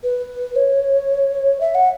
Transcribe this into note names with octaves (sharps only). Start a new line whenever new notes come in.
B4
C#5
E5
F#5